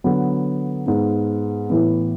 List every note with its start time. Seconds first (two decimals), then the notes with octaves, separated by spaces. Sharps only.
0.04 D3 F#3 B3
0.86 G#2 G#3 B3
1.70 A2 E3 B3